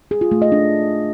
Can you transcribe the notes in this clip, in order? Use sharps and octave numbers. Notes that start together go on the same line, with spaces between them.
G#4
F4
A3
D#5
D4